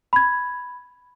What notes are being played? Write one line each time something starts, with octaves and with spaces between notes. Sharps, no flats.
B5 G#6